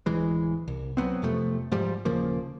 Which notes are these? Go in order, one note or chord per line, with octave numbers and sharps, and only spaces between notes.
D1 E3 G#3
C2
F#3 A3 B3 C4
F2 C3 F3 A3
G#2 F3 G3
D#1 C#3 F3 A#3